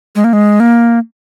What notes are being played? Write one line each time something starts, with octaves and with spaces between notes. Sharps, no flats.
G#3
A#3
G#3
A#3